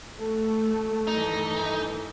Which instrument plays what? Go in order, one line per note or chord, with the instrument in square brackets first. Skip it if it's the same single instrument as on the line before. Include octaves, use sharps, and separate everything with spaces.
[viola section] A3 [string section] F#4 [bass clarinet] A4
[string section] G2 D#3 E3 [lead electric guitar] D#4